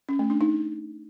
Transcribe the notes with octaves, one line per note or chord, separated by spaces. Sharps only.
C#4
A3
D4
D#4